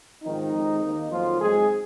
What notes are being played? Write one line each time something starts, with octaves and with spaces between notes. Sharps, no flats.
G#2 D#3 F3 C4 D#4
F2 D#3 G#3 C4
D#2 D#3 A#3
F2 D#3 F3 F#3 A#3 F4
G#2 F#3 G#3 C4 G#4